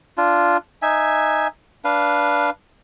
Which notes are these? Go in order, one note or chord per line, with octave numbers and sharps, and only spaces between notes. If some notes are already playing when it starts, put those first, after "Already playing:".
D4 F4
D#4 E5 G#5
D4 B4 F5